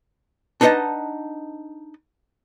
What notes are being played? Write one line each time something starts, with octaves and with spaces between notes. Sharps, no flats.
D4 D#4 B4 D#5 F#5 A5